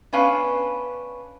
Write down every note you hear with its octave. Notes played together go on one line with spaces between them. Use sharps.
B3 C#4 D4 B4 F5